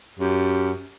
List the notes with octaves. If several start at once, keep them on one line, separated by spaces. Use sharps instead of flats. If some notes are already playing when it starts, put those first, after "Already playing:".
F#2 G4